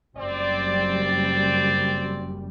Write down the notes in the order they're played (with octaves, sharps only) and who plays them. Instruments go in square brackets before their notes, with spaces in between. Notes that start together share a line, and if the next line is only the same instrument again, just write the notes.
[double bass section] F#1 F#2 G3 [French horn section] C4 D5